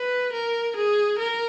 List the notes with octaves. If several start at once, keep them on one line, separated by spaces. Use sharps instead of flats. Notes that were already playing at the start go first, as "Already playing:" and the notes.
Already playing: B4
A#4
G#4
A#4